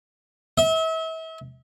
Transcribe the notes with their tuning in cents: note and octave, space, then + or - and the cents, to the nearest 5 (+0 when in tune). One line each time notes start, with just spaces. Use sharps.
E5 -35